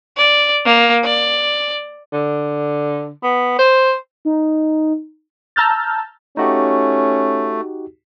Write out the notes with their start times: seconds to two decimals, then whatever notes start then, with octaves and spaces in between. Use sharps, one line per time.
0.17 D5
0.65 A#3
1.04 D5
2.13 D3
3.23 B3
3.58 C5
4.25 D#4
5.56 A5 A#5 E6 F6 G6 A6
6.37 A3 C#4 D#4 F#4 G4